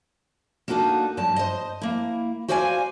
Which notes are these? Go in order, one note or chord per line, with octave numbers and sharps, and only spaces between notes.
A#3 D4 D#4 F#4 A4
E2 G2 F#3 A5
C5 D#5
A#3 E4
F#4 C5 D5 F5 F#5 G#5